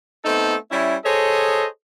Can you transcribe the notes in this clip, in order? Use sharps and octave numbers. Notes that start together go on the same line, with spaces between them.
A3 B3 C4 D#4 A4
G3 C#4 E4
G#4 A4 C5 C#5 D#5